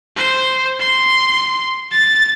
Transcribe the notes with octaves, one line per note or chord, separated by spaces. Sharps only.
C5
C6
A6